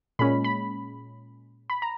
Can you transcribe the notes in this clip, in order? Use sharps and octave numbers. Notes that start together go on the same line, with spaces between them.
A#2 G#3 C#4 B5
B5
B5
A#5